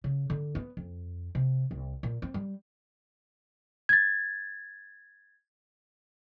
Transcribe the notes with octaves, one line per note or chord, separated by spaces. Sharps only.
C#3
D3
B3
F2
C3
C2
A#2
C4
G3
G#6 A6